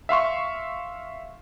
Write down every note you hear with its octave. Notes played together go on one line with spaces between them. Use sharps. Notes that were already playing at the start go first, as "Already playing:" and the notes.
E5 F5 C6 C#6